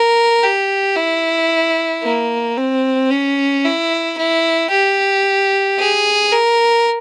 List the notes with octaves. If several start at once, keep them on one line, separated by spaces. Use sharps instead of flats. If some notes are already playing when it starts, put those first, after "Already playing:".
Already playing: A#4
G4
E4
A#3
C4
C#4
E4
E4
G4
G#4
A#4